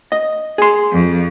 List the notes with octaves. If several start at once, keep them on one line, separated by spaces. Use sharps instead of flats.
D#5
G#4 C6
F2